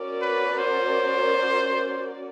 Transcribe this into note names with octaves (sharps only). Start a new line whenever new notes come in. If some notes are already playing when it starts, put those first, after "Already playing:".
Already playing: C#4 F#4 A#4 D5
B4
C5